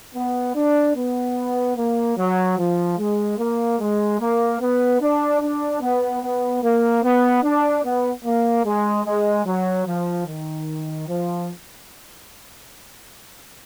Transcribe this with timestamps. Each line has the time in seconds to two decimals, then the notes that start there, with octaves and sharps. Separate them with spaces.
0.14 B3
0.55 D4
0.96 B3
1.76 A#3
2.17 F#3
2.58 F3
2.98 G#3
3.38 A#3
3.80 G#3
4.20 A#3
4.61 B3
5.01 D4
5.41 D4
5.81 B3
6.22 B3
6.63 A#3
7.03 B3
7.43 D4
7.84 B3
8.25 A#3
8.65 G#3
9.05 G#3
9.46 F#3
9.86 F3
10.27 D#3
11.08 F3